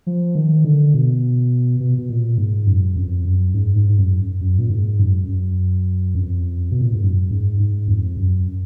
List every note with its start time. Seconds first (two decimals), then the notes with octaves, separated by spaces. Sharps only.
0.07 F3
0.35 D#3
0.65 D3
0.94 B2
1.80 B2
1.98 B2
2.09 A#2
2.38 G#2
2.67 F#2
2.96 F2
3.25 F#2
3.54 G#2
3.76 G#2
3.89 G#2
3.98 F#2
4.41 F#2
4.58 A#2
4.70 G#2
4.99 F#2
5.28 F#2
6.15 F2
6.71 B2
6.81 A#2
6.92 G#2
7.02 F#2
7.31 G#2
7.59 G#2
7.88 F2
8.17 F#2